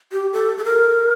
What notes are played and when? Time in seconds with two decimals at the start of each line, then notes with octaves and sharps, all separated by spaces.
0.12 G4
0.33 A4
0.58 A4
0.64 A#4